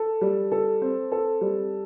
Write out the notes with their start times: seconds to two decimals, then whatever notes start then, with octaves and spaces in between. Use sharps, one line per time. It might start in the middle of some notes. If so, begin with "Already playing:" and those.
Already playing: A4
0.21 G3
0.52 A4
0.82 C4
1.12 A4
1.41 G3